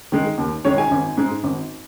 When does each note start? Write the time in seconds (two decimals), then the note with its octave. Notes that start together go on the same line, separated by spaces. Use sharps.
0.12 D#3 G#3
0.38 D#2
0.65 D#3 G#3 C#5
0.78 G#5
0.91 G#1
1.17 G#2 G#3
1.44 G#1